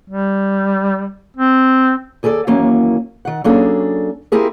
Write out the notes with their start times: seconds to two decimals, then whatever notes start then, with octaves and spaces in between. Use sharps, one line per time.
0.10 G3
1.37 C4
2.23 D#2 G#4 A4 C5 D5
2.47 D#2 E3 F#3 A#3 C#4
3.25 D#3 F#5
3.44 F#3 A#3 C#4 D4 G#4 A4
4.32 C4 E4 F4 G4 G#4 A#4